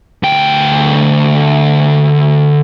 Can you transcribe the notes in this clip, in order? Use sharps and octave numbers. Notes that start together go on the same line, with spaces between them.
D2 G5